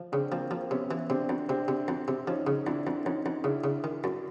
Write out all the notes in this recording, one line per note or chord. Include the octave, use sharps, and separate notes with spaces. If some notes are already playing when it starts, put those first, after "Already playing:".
Already playing: F3
C#3 C4 D4
F3 A#3 C4
F3 A#3 C4
C3 B3 C#4
E3
C3 C4 D4
F2
C3 C4 D4
C3
F2
C3
F3 C#4 D#4
C#3
F2 D4 E4
F2
F2 C#4 D#4
F2
C#3 D4 E4
C#3
D#3
F#2